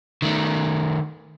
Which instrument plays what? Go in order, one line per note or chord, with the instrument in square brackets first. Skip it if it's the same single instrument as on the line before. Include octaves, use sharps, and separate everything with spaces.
[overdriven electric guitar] D#3 A3